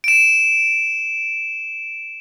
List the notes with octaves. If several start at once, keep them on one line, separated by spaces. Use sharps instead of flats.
D7 E7